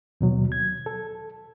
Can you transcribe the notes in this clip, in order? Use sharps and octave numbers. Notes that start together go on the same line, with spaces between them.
D#2 B2 F#3
G#6
A4